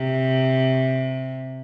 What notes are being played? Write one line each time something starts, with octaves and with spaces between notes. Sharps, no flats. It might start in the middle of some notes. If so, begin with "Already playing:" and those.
Already playing: C3